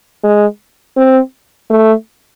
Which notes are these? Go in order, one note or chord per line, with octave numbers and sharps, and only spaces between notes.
G#3
C4
A3